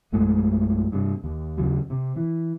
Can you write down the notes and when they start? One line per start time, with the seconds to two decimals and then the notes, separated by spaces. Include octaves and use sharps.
0.12 A#1 F#2 G#3 A3
0.92 G2 C3
1.24 D#2
1.57 D#2 C#3 F#3
1.90 C3
2.16 E3